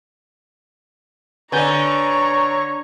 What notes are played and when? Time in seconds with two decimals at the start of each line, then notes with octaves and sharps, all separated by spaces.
1.52 D3 B4 C#5 G#5 A#5 C#6 G6